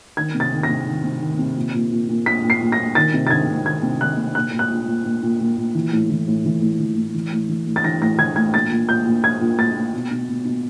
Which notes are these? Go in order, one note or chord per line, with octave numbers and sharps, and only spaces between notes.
D#3 G#6
C3
A6
D#3
A#6
C3
D#3
C3
D#3
C3
A#2
A#2
A#2
A#2
A#2 B6
A#2
C7
A#2
A#6
A#2
D#3 A6
C3
A6
D#3 G#6
C3
D#3 G#6
C3
D#3 F#6
C3
A#2 F#6
A#2
F#6
A#2
A#2
A#2
A#2
A#2
A#2
E3
A2
E3
A2
E3
A2
E3
A2
E3
A2
E3
A2
A6
E3 A#6
A2 A#6
E3 G#6
A2 G#6
A#2 A6
A#2
A#2 G6
A#2
A#2 G#6
A#2
A#2 A6
A#2
B2
B2
B2
B2